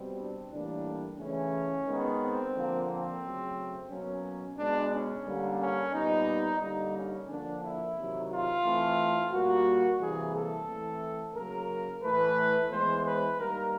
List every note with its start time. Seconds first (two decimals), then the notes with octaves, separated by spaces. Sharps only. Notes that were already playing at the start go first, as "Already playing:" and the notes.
Already playing: B2 G3 C4
0.17 D4
0.51 A2 E3 G3 A#3 D4
1.19 C#3 E3 A3 C#4
1.86 D#3 G#3 B3
2.20 C4
2.54 D3 F3 A#3
2.88 C4
3.22 C#3 F#3 A3
3.89 B2 F#3 A#3 C#4
4.57 B2 G#3 B3 D4
4.91 C#4
5.25 D3 G3 A#3
5.59 C#4
5.93 A#2 G3 B3 D#4
6.60 D3 G3 A#3 D#4
6.95 C#4
7.28 D3 F3 A#3 D4
7.62 E4
7.96 C3 D#3 F#3
8.30 F4
8.64 E3 A3 C4
9.32 A#2 G3 A#3 F#4
9.99 C3 E3 G3 A#3 G#4
10.33 A4
10.67 E3 A3 C4
11.35 C#3 F#3 A#3 A#4
12.03 A2 E3 A3 B4
12.70 E3 G#3 B3 C5
13.04 B4
13.38 D#3 G3 A#3 A#4